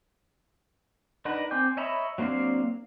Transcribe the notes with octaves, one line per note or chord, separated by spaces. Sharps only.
D4 D#4 A#4 B4 F#5
C4 G5 G#5 D6 G6
C#5 D#5 E5 A#5 B5
F#3 A#3 C4 D4 F5